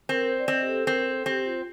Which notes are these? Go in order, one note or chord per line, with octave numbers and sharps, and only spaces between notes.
C4 A#4
C5
D5
C4 D#5
G4
A4
C4 A#4
A4
C4 G4
F4